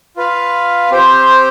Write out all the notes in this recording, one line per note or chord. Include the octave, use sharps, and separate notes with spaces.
F4 B4 F5
C4 G4 C5 G5